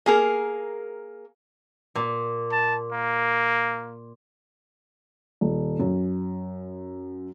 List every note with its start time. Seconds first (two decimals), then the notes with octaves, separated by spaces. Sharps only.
0.06 A#3 G#4 A#4
1.95 A#2
2.52 A5
2.92 A#3
5.41 D#1
5.79 F#2